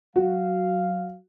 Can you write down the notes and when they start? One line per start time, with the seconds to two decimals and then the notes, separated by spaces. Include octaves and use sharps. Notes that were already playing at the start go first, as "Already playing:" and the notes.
0.16 F#3 F#4 F5